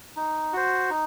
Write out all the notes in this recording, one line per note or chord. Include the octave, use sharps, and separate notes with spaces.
D#4
F#4 C5
D#4